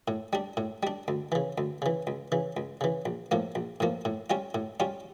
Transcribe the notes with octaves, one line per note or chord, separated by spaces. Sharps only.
A2
G3 D4
A2
G3 D4
D2
C#3 E3
D2
C#3 E3
C#2
C#3 E3
C#2
C#3 E3
A#1
A2 F3 A#3
A#1
A2 F3 A#3
A2
G3 C#4 F4
A2
G3 C#4 F4